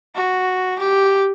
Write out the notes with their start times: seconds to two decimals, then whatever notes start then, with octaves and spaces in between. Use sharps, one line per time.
0.15 F#4
0.80 G4